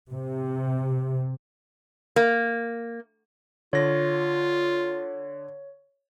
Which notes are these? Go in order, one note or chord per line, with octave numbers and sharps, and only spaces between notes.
C3
A#3
D3 F4 C#5 A#6